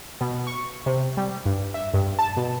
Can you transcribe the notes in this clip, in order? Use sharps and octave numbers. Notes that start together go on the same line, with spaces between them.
B2
C#6
C3
G3
G2
E5
G2
A5
B2